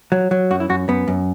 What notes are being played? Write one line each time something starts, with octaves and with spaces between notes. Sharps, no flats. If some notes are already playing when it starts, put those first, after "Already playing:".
F#3
F#3
F#2 F#4
E4
F#2 F#4
F#2 B3
F#2